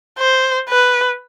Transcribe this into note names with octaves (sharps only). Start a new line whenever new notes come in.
C5
B4